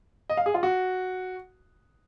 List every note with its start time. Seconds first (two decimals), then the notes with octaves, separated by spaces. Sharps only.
0.30 D#5
0.37 F5
0.46 G#4
0.54 F4
0.63 F#4